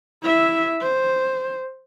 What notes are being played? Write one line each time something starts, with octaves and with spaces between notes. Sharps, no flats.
E4 E5
C5